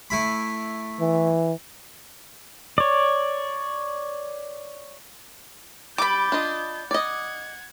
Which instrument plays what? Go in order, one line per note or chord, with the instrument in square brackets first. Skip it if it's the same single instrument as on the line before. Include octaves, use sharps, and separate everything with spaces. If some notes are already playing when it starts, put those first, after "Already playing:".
[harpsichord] A3 E4 B5
[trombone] E3
[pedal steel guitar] C#5 D5
[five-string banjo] G3 [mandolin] B5 D6 [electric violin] G6 A6
[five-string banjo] D4 F4 D#5
[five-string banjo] D5 D#5 [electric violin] F#5 G#6